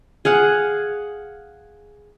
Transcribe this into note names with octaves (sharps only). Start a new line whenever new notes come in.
G#4 F5 F#5